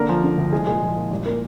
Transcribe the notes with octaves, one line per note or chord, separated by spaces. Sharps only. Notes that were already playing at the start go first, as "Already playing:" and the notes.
Already playing: D3 A#3 A#4
F3
D3
D2
C2 G#3 G#4
A#2 G#3 G#4
F3
A#2
G#1 G3 G4
A#3 A#4